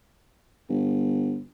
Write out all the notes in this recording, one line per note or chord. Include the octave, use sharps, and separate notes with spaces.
G1